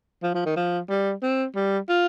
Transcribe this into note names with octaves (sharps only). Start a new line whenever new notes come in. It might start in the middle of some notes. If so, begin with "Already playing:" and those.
F3
F3
D#3
F3
G3
C4
G3
F4